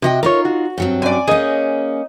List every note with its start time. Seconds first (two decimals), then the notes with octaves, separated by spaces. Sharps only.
0.02 C3 F#4 D#5 G5
0.23 D#4 F4 A#4 C#5
0.45 F#4
0.78 G2 F#3 C4
1.02 F#2 D5 G#5
1.28 A#3 C#4 D#4 G#4 D#5